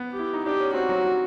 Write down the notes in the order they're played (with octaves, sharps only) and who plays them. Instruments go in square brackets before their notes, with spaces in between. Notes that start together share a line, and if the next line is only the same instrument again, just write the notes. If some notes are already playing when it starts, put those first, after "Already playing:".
Already playing: [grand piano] B3
[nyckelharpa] G4
[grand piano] E4
D#4
[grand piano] D4 [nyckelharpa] G4
[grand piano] C#4
[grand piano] C4 [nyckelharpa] F#4
[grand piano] F#3
F#3